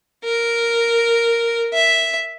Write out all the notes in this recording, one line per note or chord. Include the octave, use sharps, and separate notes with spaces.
A#4
E5